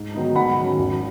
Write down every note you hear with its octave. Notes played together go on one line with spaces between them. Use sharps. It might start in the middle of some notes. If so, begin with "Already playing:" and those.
Already playing: G#2
D#3 F#3 B3 D#4
G#2 F#5 B5
D#3 F#3 C#4
G#1